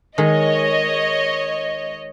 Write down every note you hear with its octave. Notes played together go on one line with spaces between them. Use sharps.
D#3 G#3 C#5 D#5